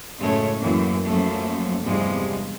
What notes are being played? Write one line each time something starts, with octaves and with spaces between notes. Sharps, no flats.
F#2 A2 C#3 G#3 A3 C#5
F#2 E3 A#3
F#2 F3 A3 A#3
E2 G2 C3 F3 G3 G#3